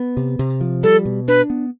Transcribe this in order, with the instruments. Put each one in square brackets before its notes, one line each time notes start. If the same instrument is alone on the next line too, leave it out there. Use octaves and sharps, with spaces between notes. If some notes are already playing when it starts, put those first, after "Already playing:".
Already playing: [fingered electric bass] B3
C3
C3
F3
[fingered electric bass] G3 [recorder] A4
[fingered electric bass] B2
[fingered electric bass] D4 [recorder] B4
[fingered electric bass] B3